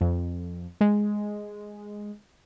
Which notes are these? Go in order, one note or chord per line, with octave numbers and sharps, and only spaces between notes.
F2
G#3